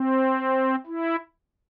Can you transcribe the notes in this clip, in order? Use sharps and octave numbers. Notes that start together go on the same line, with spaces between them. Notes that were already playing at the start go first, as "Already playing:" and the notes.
Already playing: C4
E4